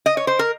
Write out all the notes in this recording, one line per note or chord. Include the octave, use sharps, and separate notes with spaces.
D#5
C#5
C5
A#4